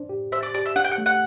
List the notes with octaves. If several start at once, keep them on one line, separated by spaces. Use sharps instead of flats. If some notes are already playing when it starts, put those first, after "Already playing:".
Already playing: D4 C5
G4
C5 E5
D5
G4 D5
E5
D4 F#5
G5
F#5
A3
F#5